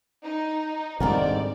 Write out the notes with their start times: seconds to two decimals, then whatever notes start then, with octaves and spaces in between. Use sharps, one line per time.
0.23 D#4
1.00 G#2 D#3 G3 C4 D4 A4 A#4 D5